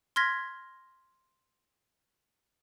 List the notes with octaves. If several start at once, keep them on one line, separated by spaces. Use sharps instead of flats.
C6 F6 G#6 A#6 B6